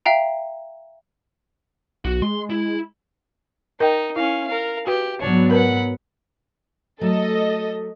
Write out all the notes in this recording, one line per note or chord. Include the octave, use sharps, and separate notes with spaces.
E5 F5 G5 A#5
B1 F#4
G#3 C6
E4
D#4 A#4 D#5 G5
C#4 E4 F5
A#4 F5
F#4 G4 B4
G#2 F#3 B3 D4 C#5
A#4 B4 F#5 B5
F#3 A3 A4 D#5